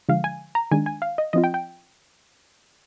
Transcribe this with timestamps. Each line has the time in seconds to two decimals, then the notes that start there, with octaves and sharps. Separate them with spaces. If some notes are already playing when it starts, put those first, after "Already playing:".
0.09 D3 F3 G#3 F5
0.24 G#5
0.55 A#5
0.71 D#3 G#3 D4 G#5
0.86 G#5
1.02 F5
1.18 D#5
1.33 F3 C4 F4 D#5
1.44 G5
1.54 G5